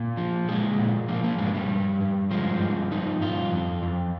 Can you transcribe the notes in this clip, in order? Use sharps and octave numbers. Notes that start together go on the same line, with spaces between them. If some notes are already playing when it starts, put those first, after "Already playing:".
Already playing: A#2
F3
A#2 G#3
A#2
F3 A#3
A#3
G2 G#3
G3
G2
G2
F3 G#3
G2
F3 D#4
G2 F4
F2
F2